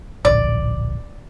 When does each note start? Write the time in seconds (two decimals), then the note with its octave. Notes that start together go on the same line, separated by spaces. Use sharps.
0.25 D1 A#1 D5